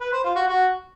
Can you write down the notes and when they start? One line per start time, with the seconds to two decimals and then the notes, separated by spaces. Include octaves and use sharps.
0.01 B4
0.12 C5
0.24 F4
0.36 F#4
0.48 F#4